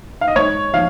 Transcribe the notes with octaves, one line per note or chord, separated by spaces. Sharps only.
F5
D#5
G#2 C#5
F3 F5